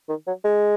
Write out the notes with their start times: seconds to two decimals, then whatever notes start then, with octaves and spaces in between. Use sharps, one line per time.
0.09 D#3
0.27 F#3
0.44 G#3